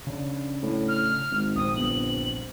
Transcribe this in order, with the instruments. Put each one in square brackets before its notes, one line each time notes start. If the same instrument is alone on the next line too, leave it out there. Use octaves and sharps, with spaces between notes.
[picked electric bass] C#3 C#4 D4
[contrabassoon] A2
[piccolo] F6
[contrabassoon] G#1
[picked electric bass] A#1 C4 [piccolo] D#6
[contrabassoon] G1 [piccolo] F#7